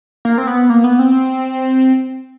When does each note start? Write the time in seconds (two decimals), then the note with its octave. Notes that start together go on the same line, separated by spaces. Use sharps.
0.25 A#3
0.38 C4
0.47 B3
0.70 A#3
0.84 B3
0.99 C4